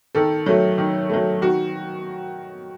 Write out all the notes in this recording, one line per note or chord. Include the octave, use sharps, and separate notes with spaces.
D#3 A4
F#3 A3
D#3
F#3 A3
D#3 F#4